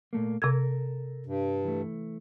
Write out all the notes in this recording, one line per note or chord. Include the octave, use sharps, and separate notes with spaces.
A#2 A3 A#3
C3 A4 A#4 E6 G#6
G2
E3 A3